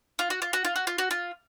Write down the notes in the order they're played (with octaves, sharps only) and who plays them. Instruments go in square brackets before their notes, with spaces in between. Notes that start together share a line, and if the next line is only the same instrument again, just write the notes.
[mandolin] F4
F#4
F4
F#4
F4
F#4
F4
F#4
F4